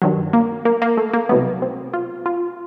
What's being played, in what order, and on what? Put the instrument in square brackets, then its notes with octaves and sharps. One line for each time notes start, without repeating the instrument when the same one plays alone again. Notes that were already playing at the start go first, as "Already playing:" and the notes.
[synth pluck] G2 D#3 F#3
A#3
A#3
A#3
A3
A#3
C2 B2 F#3 A3 B3
C4
F4
F4